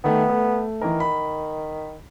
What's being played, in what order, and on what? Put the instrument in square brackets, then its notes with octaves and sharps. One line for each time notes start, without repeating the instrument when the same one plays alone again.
[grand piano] D#3 A3 [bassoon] B3
[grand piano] A3
[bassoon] D#3 [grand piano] E3 A#4
[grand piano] B5